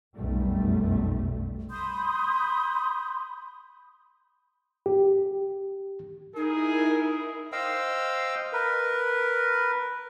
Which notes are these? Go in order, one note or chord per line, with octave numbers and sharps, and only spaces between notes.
F1 B1 F#2 G3 A3
B5 C6 D#6 G6
G4
D#4 E4 G#4 A#4
C5 D#5 F5 G5 E6
A#4 B4